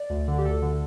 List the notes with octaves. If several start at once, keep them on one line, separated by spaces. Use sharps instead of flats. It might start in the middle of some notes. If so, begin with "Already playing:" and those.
Already playing: D5
D2
D3
G4
D2 A4
D3